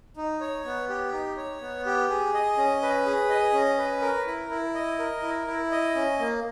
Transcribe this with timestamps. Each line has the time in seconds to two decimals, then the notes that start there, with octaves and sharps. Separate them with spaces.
0.17 D#4
0.41 C#5
0.65 B3
0.89 G4
1.13 D#4
1.37 C#5
1.61 B3
1.86 G4
2.10 G#4
2.34 D#5
2.58 C#4
2.82 B4
3.06 G#4
3.30 D#5
3.54 C#4
3.78 B4
4.02 A#4
4.27 E4
4.51 E4
4.75 D#5
4.99 A#4
5.22 E4
5.47 E4
5.71 D#5
5.95 C#4
6.20 A#3